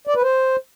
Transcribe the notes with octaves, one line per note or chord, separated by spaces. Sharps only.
D5
B4
C5